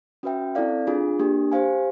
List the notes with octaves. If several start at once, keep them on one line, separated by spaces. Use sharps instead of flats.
C#4 F#4 B4 E5 G5
C4 E4 A4 D5 F5
D4 F4 G#4
A#3 D4 G4
G4 C5 F5 G#5